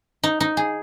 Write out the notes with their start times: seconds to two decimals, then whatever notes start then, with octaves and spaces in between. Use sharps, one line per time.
0.23 D#4
0.40 D#4
0.57 G#4